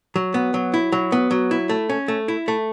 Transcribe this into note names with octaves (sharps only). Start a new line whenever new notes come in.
F#3
B3
F#3
E4
F#3
B3
F#3
E4
A3
C#4
A3
E4
A3